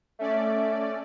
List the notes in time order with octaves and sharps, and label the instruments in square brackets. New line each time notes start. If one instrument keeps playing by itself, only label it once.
[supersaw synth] A3 C#4 D5 [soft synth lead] E5